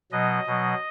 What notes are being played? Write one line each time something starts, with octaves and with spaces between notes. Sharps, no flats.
B2 F#3 D#5
B2 F#3